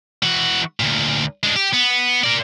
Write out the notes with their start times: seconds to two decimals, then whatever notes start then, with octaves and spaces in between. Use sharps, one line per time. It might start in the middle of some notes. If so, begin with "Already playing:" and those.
0.23 E3 F#4
0.80 D2 A#2
1.43 G#3 D4
1.56 G4
1.73 B3
2.24 A#4 D5